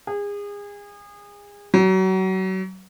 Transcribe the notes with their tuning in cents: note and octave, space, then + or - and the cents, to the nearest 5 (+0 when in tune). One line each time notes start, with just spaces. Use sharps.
G#4 -30
F#3 +30